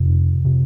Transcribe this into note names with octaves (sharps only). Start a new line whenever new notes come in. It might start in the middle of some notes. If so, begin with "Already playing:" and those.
Already playing: F2 C3
C3